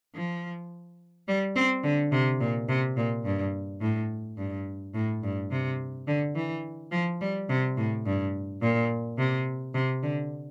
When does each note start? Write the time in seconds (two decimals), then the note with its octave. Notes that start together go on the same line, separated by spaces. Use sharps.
0.15 F3
1.28 G3
1.56 C4
1.84 D3
2.12 C3
2.41 A#2
2.69 C3
2.97 A#2
3.25 G2
3.81 A2
4.38 G2
4.95 A2
5.23 G2
5.51 C3
6.08 D3
6.35 E3
6.92 F3
7.21 G3
7.49 C3
7.77 A2
8.06 G2
8.62 A#2
9.18 C3
9.74 C3
10.03 D3